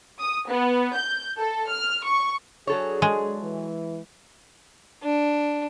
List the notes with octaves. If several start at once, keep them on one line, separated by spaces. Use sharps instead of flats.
D#6
B3
G6
A4
F6
C#6
F#3 D4 G#4 A4 C#5
G#3
E3
D4